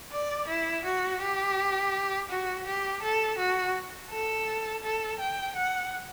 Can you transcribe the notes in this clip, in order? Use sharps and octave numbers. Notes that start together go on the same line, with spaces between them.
D5
E4
F#4
G4
F#4
G4
A4
F#4
A4
A4
G5
F#5